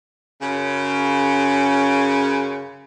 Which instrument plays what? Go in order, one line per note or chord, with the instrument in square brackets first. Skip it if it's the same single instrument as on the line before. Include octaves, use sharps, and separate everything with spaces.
[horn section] F#2 C#3